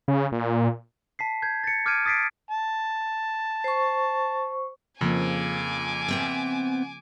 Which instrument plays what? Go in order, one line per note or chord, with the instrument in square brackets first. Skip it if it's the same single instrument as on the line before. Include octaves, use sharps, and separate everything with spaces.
[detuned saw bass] C#3
A#2
[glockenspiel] A5 B6 C7
G6 G#6
A6 C#7
D6 F6 G6 G#6 D7 D#7
D#6 A6 B6 C7 D7
[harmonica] A5
[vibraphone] C5 C#6
[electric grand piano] F2 [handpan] C#3 F3 A#3 [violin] G#5 D6
[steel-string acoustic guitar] B3 C4 E5